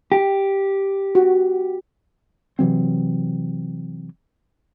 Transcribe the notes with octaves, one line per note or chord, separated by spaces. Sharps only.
G4
F#4
C3 E3 F#3 C4